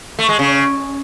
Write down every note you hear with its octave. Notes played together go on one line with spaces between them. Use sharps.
A3
G#3
C#3